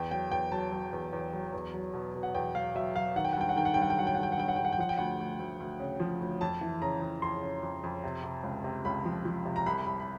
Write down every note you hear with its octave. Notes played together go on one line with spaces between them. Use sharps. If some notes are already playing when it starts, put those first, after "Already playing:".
Already playing: E2 G5
F#3 G5
E2 G5
F#3 A5
F#3
E2
E2
F#3
E2
F#3
B2
B2
F#5
E2 G5
F#3 F5
F#3 E5
F#3 F5
D#3 F#5
G5
F#5
G2 G5
F#5
D#3 G5
F#5
G2 G5
F#5
G5
F#3 F#5
G5
G2 F#5
G5
F#5
G2 G5
F#5
G2 G5
F#5
G5
F3 F#5
G5
D2 F#5
D2
D2
D2
C#3
F3
D2
F2 A5
E3
C#3 A#5
F2
F2 C6
C#3
F2
F2
C3
C3
C#2
C3
C#2 B5
F3
F3
C3
A#5
C2 B5
C2 B5
B5